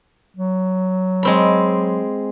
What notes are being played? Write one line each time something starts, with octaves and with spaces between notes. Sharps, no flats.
F#3
G#3 C4 B5